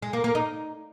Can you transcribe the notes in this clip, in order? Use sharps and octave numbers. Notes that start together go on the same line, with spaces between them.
G#3
A#3
A#3
D#4